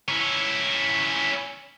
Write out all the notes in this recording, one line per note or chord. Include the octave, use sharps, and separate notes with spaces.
C#4 E4